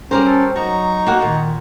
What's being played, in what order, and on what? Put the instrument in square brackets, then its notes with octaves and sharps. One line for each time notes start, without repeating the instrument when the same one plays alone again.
[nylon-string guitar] G3 A#4 C5 [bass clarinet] C#4 [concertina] A#5
[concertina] A4
[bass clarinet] F#3 [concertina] D#4 A#5 C#6 [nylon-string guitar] F#4
[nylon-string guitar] A#3 F#4 F#5
[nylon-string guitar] A#2 [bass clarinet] D#3